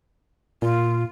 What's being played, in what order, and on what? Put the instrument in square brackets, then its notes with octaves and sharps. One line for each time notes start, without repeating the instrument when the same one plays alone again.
[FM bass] A#2 [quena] F4